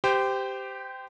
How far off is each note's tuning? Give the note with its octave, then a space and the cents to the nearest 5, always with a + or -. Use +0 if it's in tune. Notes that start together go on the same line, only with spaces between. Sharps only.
G4 +0 C5 -25 G5 +0